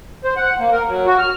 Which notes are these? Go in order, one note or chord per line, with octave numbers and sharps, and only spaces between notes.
C5
F#5
A#3
A#4
F#3
F#4
F6